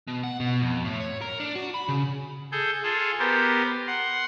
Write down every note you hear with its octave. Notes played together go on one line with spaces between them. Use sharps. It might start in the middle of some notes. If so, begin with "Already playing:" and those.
B2
F#5
B2
F2
A2
C#5
A#4
D4
F#4
B5
C#3
G#4 A4 G6
F4 G#4 A4
B3 G4 A#4 C5
F#5 C6